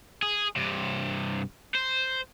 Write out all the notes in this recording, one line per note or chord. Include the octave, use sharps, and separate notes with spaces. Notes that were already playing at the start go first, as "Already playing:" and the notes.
G#4
G2 C3
C5